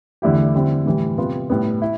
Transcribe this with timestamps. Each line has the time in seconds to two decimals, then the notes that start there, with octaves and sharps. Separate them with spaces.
0.22 E2 D3 A3 E4 G4
0.55 D3 G3 C4 E4
0.85 A2 E3 G3
1.18 C3 G3 B3 F4
1.50 A2 G3 B3
1.82 E4